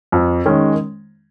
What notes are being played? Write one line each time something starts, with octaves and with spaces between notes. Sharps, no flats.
F2
D#3 G#3 C#4